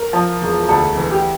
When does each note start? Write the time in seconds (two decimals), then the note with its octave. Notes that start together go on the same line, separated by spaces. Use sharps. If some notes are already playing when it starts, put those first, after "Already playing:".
Already playing: A#4
0.13 F3
0.41 E1
0.68 D2 A4
0.97 E3
1.11 G4